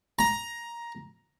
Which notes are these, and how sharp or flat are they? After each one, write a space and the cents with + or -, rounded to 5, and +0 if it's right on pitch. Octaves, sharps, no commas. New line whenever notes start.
A#5 +10